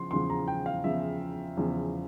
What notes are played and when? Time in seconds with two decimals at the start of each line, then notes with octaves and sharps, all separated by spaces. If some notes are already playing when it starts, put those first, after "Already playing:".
Already playing: C#3 F3 C6
0.11 E2 C#3 F3 C6
0.30 A#5
0.48 G5
0.66 F5
0.84 E2 C#3 F3 E5
1.57 E2 C#3 F3